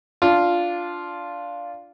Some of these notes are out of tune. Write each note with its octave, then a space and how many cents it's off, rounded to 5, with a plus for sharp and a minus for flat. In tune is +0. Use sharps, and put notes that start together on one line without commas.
D4 -10 F4 +0